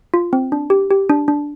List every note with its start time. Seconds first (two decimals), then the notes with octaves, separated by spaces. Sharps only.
0.14 F4
0.33 C4
0.52 D4
0.70 G4
0.91 G4
1.10 D4
1.28 D4